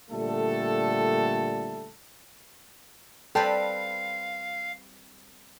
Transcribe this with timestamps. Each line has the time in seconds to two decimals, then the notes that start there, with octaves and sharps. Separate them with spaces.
0.11 A#2 D3 G3 A3 A4
3.35 G3 C4 A4 B4 F5 G5 A5